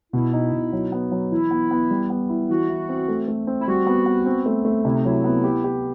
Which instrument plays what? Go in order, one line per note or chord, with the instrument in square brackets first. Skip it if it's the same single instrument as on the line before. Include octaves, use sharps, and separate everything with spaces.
[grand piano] B2 [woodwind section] E4
[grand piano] D#4
B2
F#3
B3
F#3
[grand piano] E3 [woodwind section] E4
[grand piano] B3
B3
G3
B3
E4
[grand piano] E3 [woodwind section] F#4
[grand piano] E3
C4
A3
A3
C4
[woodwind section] E4
[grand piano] G3 [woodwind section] F#4
[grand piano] B3
B3
C4
A3
A3
[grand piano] C3 [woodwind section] E4
[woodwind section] D#4
[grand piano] F#3 [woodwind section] E4
[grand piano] B3
G4
G4